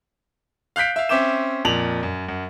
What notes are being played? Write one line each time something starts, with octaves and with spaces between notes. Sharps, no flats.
F5 F#6 G6 B6 D7
E5 F5
C4 C#4 E5 D6 G6 E7
F2 A#2 F7 F#7
F#2
F#2